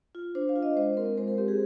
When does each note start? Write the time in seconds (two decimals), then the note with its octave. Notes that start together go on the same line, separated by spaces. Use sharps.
0.15 F4
0.35 D4 C5
0.49 F5
0.56 F4
0.62 D#5
0.76 G#3 C5
0.97 C4 A#4
1.17 G#3 C5
1.28 A#4
1.38 C4 G4
1.48 G#4